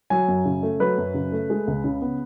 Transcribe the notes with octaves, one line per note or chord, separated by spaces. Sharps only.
F#3 G#5
F#2
C#3
A3
F#3 B4
F#2
C#3
A3
G#3
C#2
C#3
B3